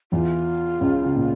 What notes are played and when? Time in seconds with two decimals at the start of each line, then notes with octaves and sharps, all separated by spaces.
0.12 E2 E3 F4
0.80 C#2 C#3
1.04 C#3
1.15 A#2